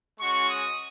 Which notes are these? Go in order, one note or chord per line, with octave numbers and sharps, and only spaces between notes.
G#3 C#4 F#4 C#6
D#6